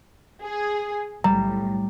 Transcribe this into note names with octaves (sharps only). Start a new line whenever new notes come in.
G#4
B1 A2 G3 A#5